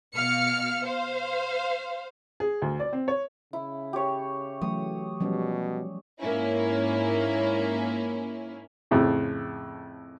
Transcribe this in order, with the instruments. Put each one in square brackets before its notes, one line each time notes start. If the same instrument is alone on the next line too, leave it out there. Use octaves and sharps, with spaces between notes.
[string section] B2 F5 F6 C#7
C5 F5
[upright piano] G#4
D2
D5
C4
C#5
[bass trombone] C#3 [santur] E4
[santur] G4 C#5
[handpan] E3 F#3 A3 [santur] D#6
[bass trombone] B2 [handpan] F3 G3 C#4
[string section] G#2 A#3 C#4 E4
[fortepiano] F2 A2 C#3